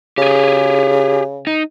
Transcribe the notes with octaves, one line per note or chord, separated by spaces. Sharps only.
C#3 G4 G#4
D#4